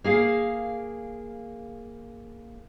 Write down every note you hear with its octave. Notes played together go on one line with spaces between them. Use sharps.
A#3 G#4 F5